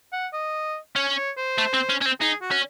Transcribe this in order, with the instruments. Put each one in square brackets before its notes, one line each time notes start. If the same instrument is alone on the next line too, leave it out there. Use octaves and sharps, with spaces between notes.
[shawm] F#5
D#5
[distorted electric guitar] C#4 [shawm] C#5
[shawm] C#5
C5
[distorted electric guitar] A3
C4
C#4
C#4
C4
[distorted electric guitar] D#4 [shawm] G#4
[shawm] F#4
[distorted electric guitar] C#4